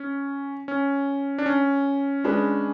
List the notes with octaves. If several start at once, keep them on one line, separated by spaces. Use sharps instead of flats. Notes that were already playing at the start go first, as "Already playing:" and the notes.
Already playing: C#4
C#4
D4
C#4
G#3 D4 G#4 B4